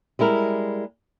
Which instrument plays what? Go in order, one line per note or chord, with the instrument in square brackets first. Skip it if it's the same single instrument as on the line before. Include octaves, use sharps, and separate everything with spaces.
[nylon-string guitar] G3 G#3 E4 A#4